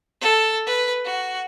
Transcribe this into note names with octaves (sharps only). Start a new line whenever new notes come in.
A4
B4
F#4